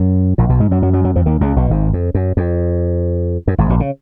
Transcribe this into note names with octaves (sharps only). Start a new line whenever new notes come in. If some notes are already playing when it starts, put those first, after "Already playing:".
Already playing: F#2
A#1 A#2
B1 B2
G#2 G#3
F#2 F#3
F#2 F#3
F#2 F#3
F#2 F#3
F2 F3
D#2 D#3
C#2 C#3
B1 B2
G#1 G#2
F2
F#2
F2
F#2
G#1 G#2
A#1 A#2
C#3